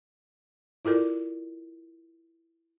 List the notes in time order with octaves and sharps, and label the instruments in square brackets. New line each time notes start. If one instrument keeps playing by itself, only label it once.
[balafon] E4 F4 A4 A#4 D5